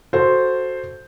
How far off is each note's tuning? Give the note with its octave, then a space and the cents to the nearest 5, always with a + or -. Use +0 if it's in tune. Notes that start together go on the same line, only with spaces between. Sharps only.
F#4 +0 A4 +0 C5 +0